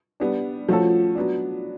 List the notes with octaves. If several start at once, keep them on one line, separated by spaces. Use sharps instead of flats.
G3 B3 D4
F3 A3 C#4 F#4 A4
F#3 B3 D4